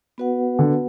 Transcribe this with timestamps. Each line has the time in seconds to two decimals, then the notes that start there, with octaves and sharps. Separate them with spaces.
0.18 B3 F#4 B4 F#5
0.59 D3